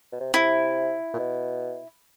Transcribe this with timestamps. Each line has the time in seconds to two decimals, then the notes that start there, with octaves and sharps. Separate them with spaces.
0.12 B2
0.20 C3
0.34 C3 E4
1.13 A#2
1.19 B2